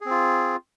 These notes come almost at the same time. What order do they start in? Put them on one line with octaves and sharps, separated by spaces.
G#4 C4 F4